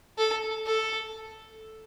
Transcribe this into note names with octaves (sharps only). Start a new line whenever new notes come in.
A4
A4